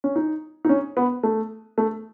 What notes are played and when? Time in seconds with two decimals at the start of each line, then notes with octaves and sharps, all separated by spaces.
0.04 C#4
0.16 D#4
0.65 D#4
0.69 C#4
0.97 B3
1.23 A3
1.78 A3